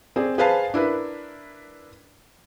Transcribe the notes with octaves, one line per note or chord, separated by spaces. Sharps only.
C4 G#4 D5
G#4 B4 C5 F5 A5
D4 E4 A#4 B4